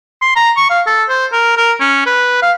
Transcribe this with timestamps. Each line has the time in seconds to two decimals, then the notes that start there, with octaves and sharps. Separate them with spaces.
0.22 C6
0.36 A#5
0.57 C#6
0.71 F5
0.87 A4
1.09 C5
1.32 A#4
1.57 A#4
1.80 C#4
2.07 B4
2.42 F5